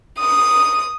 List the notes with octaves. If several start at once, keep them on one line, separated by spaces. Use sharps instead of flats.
D#6